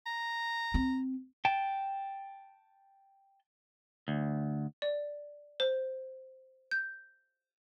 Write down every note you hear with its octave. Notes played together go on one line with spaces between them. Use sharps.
A#5
C4
G5 A5
D2
D5
C5
G6